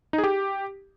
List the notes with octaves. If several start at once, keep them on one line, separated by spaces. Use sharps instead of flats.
D#4
G#4
G4